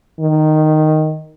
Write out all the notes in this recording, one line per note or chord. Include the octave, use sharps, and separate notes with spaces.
D#3